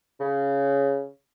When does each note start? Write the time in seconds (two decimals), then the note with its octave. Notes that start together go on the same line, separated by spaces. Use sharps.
0.20 C#3